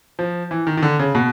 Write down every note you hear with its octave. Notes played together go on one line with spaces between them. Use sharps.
F3
E3
D#3
D#3
D3
C#3
B2